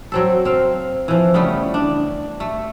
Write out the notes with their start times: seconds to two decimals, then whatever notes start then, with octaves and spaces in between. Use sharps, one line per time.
0.12 F#3 C4 A4
0.45 C4 F5
1.08 E3 F3
1.34 C#3 G3 A3 B3
1.74 D4
2.40 A3